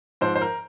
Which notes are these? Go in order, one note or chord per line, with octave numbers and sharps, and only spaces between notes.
G#2 F3 C5
C5
A#4